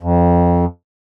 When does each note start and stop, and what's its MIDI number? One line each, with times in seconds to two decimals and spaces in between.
0.03 0.65 41